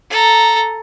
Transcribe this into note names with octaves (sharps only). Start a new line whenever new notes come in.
A4 A#5